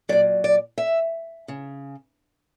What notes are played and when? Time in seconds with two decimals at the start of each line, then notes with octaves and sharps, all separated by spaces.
0.09 A#2 F#3 D5
0.44 D5
0.78 E5
1.48 C#3